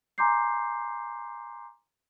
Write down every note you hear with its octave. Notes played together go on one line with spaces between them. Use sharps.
G#5 A#5 C6 D6 G6 C7